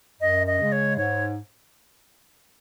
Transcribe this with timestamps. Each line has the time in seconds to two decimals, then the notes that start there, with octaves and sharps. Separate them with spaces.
0.21 F#2 D#5
0.47 D#5
0.60 C#3 G#3
0.72 C#5
0.98 G#2 C#5